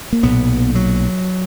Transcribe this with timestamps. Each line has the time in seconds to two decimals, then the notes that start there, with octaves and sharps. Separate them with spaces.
0.13 A#3
0.23 B1 A#2 B3
0.75 F#3